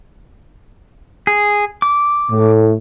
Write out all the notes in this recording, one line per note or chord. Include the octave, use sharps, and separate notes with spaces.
G#4
D6
A2